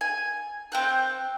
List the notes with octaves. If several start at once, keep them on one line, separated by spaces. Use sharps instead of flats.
G#5
C4 G5 F#6